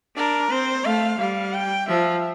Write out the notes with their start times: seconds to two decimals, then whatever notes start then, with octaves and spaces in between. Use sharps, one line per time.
0.16 D4 A#4
0.51 C4 C5
0.85 A3 F5
1.19 G3 F5
1.53 G5
1.88 F3 E5